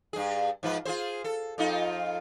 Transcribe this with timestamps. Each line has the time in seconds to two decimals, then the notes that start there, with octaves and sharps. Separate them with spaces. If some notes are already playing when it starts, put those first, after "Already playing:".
0.13 G2 G#4
0.63 G#2 F3 B4
0.85 F4 G#4 C5
1.24 A4
1.58 F2 D#4 F4